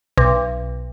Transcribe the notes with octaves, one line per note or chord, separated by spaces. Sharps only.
B1